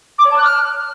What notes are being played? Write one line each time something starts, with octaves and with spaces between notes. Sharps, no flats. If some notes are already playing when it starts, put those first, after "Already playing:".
D6
C#5
A5
F#6
F6